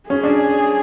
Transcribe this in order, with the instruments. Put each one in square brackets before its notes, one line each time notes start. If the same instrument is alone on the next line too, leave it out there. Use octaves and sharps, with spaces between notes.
[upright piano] C#4 [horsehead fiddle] G#4
[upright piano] D4